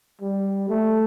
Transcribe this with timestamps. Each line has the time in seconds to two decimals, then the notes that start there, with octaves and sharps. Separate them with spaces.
0.22 G3
0.69 A3